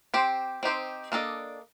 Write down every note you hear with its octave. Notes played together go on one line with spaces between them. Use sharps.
C4 G4 C5
C4 D#4 G4 C5
A#3 D4 A4 D#5